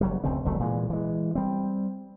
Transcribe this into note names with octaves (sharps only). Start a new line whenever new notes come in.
F#1 F#3 G3
F1 D2 C#3 C4
E1 C2 F#3 A3
A#2 E3 G#3
E3 G#3
G3 C4